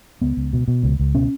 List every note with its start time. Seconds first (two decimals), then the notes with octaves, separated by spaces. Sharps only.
0.22 C#2 B3
0.37 C#2
0.53 B2
0.68 B2
0.83 C#2
0.99 C#2
1.15 B2 C#4